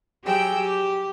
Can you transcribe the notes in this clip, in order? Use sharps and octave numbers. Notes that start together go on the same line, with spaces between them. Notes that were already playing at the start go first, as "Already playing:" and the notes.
F#3 G4 G#4 G5 E6
G4